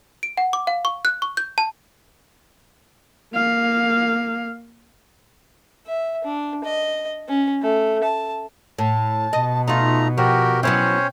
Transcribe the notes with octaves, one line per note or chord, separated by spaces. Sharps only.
D7
F#5
D6
F5
C#6
F#6
C#6
G6
A5
A#3 F5
E5
D4
D#5
C#4
A3
A5
A2 A5
B2 D#5
A3 D#4 F4 A#5 C6
F3 F#4 G4 A#4 G5
F#3 B3 C#4 E4 C5 C#5